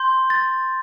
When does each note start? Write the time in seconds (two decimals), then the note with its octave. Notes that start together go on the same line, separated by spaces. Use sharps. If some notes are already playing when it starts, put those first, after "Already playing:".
Already playing: C6 G6
0.30 A6